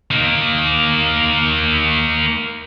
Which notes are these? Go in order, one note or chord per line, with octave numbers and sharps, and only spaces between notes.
A#3 D#4